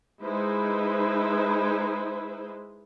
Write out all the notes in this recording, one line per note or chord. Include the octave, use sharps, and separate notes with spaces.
G#3 D#4 E4 B4 C5